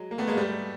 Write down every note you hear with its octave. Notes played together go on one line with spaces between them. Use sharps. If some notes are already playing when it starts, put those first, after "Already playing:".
Already playing: F#3 G#3
A#3
A3 B3
G#3 A#3
G3 A3